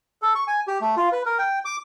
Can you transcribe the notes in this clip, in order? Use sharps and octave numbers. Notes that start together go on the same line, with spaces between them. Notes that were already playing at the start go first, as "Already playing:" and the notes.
A4
C#6
G#5
G4
A3
F4
B4
A#4
G5
D6